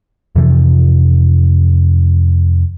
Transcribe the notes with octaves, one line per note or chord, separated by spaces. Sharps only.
F2 C3 E3 F3